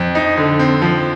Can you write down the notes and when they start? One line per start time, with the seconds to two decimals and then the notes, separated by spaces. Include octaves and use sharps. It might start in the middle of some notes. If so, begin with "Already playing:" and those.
Already playing: F2
0.15 D#4
0.37 D3
0.59 C4
0.82 F3